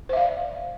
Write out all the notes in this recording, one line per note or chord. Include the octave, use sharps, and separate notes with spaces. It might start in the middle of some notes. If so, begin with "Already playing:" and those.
C5 D5 E5 F5